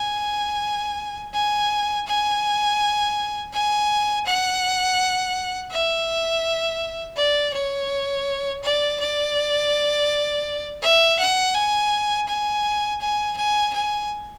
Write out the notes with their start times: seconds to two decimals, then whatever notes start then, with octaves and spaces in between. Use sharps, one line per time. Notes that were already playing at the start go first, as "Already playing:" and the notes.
Already playing: G#5
1.34 G#5
2.07 G#5
3.53 G#5
4.26 F#5
5.71 E5
7.17 D5
7.53 C#5
8.63 D5
9.00 D5
10.82 E5
11.19 F#5
11.54 G#5
12.28 G#5
13.01 G#5
13.37 G#5
13.74 G#5